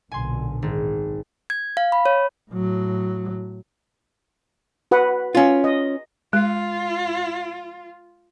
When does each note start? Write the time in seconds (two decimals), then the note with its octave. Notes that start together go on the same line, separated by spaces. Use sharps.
0.12 B1 A#2 D3 G#5 C6
0.62 G#1
1.50 G#6
1.77 F5
1.92 B5
2.06 C#5
2.51 A2 F#3
4.91 F#4 B4 F#5
5.35 C#4 F4
5.64 D#5
6.33 G#3 F4